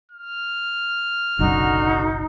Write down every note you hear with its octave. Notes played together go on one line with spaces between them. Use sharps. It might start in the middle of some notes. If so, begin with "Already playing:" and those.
F6
F#1 B1 F#2 D3 D#4 F#4